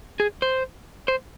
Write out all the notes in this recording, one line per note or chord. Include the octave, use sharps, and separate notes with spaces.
G#4
C5
C5